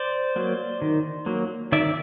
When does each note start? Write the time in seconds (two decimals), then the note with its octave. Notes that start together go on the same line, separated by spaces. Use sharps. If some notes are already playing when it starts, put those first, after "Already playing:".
Already playing: C5 D5
0.36 F#3 A#3
0.82 D#3
1.26 F#3 A#3
1.72 D#3 D5 E5